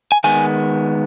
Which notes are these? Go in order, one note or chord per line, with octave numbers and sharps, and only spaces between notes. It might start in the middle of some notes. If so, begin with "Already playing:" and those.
G#5
D#3 G#3 B3 G#5